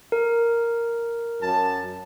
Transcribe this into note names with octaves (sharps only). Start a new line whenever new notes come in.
A#4
F#2 A5